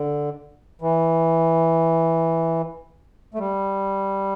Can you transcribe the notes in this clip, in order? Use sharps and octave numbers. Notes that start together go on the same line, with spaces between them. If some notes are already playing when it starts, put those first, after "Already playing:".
Already playing: D3
E3
A3
G3